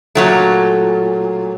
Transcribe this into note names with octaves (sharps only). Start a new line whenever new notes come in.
A#2 F#3 A3